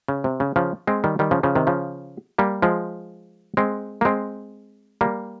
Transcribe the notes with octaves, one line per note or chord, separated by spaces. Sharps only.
C#3
C3
C#3
C#3 F3
G#3 C4
D#3 G3
D#3 G3
C#3 F3
C#3 F3
C3 D#3
C#3 F3
G3 A#3
F3 G#3
G#3 C4
A#3
G#3 C4
G3 A#3